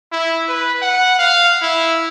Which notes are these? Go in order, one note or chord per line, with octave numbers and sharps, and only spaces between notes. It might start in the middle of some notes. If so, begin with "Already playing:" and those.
E4
B4
F#5
F5
E4